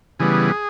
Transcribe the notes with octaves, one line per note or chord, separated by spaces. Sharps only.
C#3 E3 G3 B3 G#4